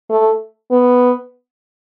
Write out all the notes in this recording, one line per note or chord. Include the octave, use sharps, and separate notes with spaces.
A3
B3